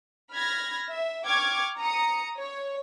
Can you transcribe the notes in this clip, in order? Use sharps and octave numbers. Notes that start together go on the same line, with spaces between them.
B5 F6 G#6 A#6
E5
G5 C#6 D6 F6 G#6
A#5 D#6 C#7
C#5